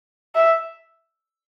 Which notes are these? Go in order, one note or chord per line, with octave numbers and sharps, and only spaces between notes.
E5